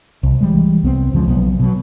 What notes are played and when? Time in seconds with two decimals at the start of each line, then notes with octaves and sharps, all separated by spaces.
0.23 C2
0.41 E3 G3 G#3
0.83 C2 B3 C4
1.13 C#2 C#3 F3 G#3
1.28 B1 B3
1.60 B2 F#3